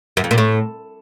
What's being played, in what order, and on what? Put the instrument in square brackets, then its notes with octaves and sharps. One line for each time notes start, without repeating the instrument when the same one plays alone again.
[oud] F#2
F2
A#2
A2